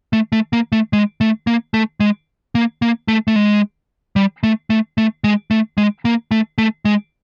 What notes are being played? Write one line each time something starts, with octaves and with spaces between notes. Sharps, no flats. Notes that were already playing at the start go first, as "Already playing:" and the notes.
A3
A3
A#3
A3
G#3
A3
A#3
A3
G#3
A#3
A#3
A3
A3
G#3
G3
A3
A3
A3
G#3
A3
G#3
A#3
A3
A3
G#3